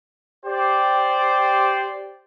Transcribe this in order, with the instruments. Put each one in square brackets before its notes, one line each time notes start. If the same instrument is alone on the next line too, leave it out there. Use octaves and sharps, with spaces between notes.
[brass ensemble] G4 C5 D5